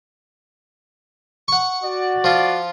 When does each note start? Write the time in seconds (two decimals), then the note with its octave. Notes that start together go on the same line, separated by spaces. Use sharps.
1.48 F#5 C#6
1.83 F#4 D5
2.24 F3 F4